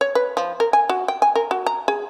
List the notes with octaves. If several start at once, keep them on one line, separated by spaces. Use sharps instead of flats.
C#5
B4
F3
A#4
G#5
F#4
G5
G#5
A#4
F#4
A#5
G#4